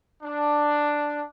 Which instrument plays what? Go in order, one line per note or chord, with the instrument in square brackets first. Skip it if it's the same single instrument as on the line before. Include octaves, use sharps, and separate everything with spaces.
[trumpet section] D4